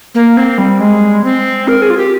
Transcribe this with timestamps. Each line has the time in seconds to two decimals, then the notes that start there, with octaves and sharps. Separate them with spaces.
0.15 A#3
0.37 C4
0.58 G3
0.80 G#3
1.24 C4
1.68 A#4
1.82 G#4
1.90 F4
1.97 G4